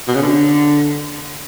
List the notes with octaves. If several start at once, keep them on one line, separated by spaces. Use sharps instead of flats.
B2
C#3
D3